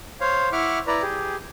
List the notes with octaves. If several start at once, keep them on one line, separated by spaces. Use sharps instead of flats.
C5 C#5 F5
E4 E5 F#5 C#6 D6 F6
E4 B4 D5 A#5
G4 G#4